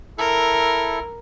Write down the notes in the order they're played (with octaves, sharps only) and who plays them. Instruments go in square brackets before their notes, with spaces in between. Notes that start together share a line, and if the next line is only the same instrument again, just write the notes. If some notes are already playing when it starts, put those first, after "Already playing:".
[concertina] E4 A4 [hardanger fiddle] A#4